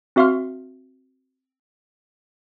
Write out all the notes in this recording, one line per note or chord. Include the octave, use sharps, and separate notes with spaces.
C4 F#4 E5 F5 C6 F6